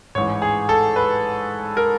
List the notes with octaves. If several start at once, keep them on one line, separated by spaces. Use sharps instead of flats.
A1 G#2 E3 C#5
G#4
A4
B4
A#4